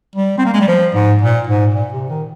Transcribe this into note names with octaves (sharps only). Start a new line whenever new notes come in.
G3
C4
A#3
G#3
G3
F3
G#2
A#2
G#2
A#2
C3
D#3